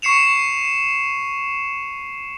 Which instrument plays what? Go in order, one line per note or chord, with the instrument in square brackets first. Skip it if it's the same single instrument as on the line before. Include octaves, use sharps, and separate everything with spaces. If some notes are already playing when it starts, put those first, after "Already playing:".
[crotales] C#6 C7 C#7 E7 F7